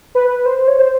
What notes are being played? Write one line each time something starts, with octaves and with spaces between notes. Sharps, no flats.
B4
C5
C#5
C5